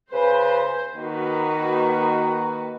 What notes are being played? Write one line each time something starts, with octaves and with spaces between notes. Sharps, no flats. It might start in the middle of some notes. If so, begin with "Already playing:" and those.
C#3 B4 C5
D#3 A#3 F#4 B4